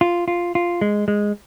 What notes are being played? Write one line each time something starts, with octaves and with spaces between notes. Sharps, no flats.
F4
F4
F4
G#3
G#3